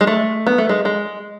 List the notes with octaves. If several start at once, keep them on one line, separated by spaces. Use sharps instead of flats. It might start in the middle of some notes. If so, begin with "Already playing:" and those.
G#3
A3
B3
A3
G#3
G#3